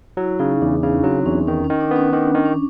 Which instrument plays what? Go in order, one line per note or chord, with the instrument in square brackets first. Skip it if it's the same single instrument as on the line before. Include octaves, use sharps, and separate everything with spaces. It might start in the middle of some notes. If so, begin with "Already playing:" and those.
[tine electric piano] F#3 [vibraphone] E4
[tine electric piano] C#3 [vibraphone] D#4
[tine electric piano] E2 [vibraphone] D4
[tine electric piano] C#3 [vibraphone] C#4
[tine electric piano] F#3 [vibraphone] C4
[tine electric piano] E2 [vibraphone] C#4
[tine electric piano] D#3 [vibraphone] C#4
[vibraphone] C#4
[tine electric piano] D#3
[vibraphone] D4
[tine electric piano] B3
[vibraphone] C#4
[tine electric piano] D#3 [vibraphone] D4
[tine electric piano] D#3
[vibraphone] C#4